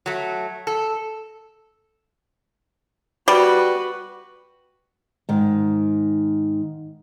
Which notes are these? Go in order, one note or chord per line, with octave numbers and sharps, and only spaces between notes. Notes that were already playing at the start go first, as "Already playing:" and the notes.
F#3 A3
A4
G3 F#4 B4
G#2 D#3